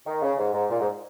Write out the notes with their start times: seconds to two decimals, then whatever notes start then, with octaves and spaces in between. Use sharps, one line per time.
0.06 D#3
0.22 C#3
0.38 G#2
0.54 G#2
0.70 A#2
0.80 G#2